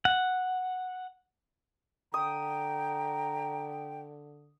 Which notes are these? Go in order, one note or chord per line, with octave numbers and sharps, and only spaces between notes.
F#5
D3 G5 A#5 D#6